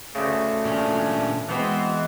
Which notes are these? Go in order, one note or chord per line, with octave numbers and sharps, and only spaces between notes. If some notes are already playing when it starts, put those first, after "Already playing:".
D2 C#3 A3
A#2 C#4 D4
E3 G#3 B3 C4 F#4 C5